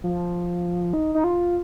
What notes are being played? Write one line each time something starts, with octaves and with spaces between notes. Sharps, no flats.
F3
D#4
D#4
F4